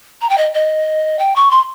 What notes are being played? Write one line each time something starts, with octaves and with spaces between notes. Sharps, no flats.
A#5
G5
D#5
D#5
G5
C#6
C6